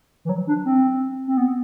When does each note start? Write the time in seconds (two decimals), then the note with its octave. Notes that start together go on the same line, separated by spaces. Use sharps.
0.25 E3
0.29 F#3
0.47 D4
0.65 C4
1.28 C4
1.37 B3